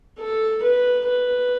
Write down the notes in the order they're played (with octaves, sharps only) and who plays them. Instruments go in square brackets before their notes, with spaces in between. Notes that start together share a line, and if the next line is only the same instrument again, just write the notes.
[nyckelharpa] A4
B4
B4